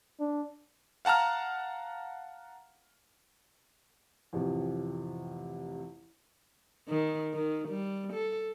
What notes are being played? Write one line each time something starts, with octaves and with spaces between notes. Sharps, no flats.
D4
F5 F#5 A5 A#5 F6
A1 F2 C3
D#3
D#3
G3
A4